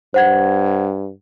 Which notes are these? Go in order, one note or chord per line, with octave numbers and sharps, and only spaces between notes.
G2 C5 F#5 G#6